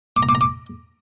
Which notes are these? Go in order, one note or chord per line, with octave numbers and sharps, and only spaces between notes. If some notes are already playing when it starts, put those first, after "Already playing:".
D6
A#5
D6
A#5
D6